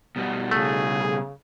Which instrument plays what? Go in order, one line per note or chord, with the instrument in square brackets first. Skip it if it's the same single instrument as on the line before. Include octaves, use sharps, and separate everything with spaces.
[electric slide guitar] B2 G3 F#4
[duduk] C#3 [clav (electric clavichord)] A3 [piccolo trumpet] G#4